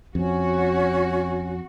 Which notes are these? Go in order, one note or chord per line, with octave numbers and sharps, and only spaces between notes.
F2 C#4 F#4